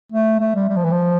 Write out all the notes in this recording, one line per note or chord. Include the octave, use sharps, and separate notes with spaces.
A3
A3
G3
G3
F3
E3
F3